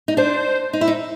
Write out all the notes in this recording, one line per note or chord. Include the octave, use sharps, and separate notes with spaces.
D#4
D4 C5
D#4
E4
D#4